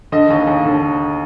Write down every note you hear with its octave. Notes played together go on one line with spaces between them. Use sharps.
D3 D#5
D#2
D#2
D3